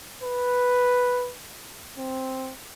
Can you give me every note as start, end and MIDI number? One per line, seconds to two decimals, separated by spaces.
0.23 1.32 71
1.98 2.52 60